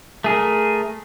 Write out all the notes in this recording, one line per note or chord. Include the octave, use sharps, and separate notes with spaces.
A3 G#4 A#4